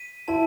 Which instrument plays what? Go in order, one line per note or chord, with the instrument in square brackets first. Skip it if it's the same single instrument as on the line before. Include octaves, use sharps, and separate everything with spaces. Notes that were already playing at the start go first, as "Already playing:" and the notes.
Already playing: [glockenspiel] B6 D#7
[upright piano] E4 [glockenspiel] A5